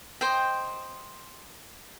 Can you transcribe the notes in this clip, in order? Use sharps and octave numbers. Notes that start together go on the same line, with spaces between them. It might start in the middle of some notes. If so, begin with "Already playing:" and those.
C5 D#5 G5